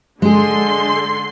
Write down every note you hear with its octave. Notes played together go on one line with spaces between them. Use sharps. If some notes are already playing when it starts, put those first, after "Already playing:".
D3 G#3 G#4 C6